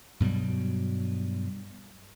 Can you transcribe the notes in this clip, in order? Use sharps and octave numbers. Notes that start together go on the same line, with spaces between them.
G2 B2 F#3 G3